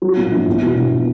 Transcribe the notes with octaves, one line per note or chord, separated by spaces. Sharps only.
F#3
A#2
A#1
E2
B2
B2